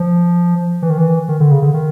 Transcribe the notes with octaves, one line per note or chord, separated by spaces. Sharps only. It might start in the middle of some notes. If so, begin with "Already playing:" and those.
Already playing: F3
E3
D#3
E3
D#3
D3
C#3
D3
D#3